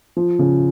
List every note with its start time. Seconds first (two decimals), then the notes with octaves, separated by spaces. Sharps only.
0.17 F3
0.39 C#3